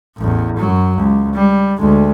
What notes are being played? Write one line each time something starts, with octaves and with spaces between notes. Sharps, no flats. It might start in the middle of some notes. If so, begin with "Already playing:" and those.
A1 E2
F#2 F#3
C#2
G3
D2 G#3